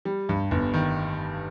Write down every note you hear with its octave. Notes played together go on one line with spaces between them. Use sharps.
G3
G2
G1
D#3